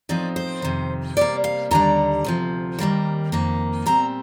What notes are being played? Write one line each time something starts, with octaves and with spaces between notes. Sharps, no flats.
A2 F3 C4 D#4 D5
C5
F2 C3 D#3
C3 G3 A#3 D5
F5
D#2 D3 G3 D4 A#5
D2 C3 F3
D#2 D#3 G3 A#3
F2 D#3 A#3
A#2 G3 C4 A#5